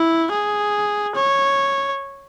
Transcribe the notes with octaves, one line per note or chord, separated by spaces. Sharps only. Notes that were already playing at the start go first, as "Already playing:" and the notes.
Already playing: E4
G#4
C#5